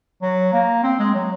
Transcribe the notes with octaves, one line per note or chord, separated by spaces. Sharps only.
F#3
A#3
C4
G#3
F#3